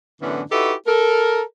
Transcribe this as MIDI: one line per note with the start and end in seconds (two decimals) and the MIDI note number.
0.21 0.42 42
0.21 0.42 45
0.21 0.42 50
0.21 0.42 52
0.21 0.42 59
0.21 0.42 61
0.51 0.72 63
0.51 0.72 64
0.51 0.72 66
0.51 0.72 67
0.51 0.72 69
0.51 0.72 71
0.87 1.42 69
0.87 1.42 70